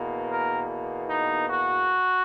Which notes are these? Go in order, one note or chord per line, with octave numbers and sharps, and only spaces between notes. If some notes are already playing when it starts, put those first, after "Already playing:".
Already playing: E2 B2 A#3
A#4
D#4
F#4